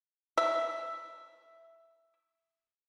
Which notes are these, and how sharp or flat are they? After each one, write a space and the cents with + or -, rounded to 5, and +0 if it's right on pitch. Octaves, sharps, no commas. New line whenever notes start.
E5 +5